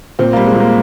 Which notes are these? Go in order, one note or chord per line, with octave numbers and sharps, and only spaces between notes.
A#2 C4
G3 A#3
G#3
A#2 A#3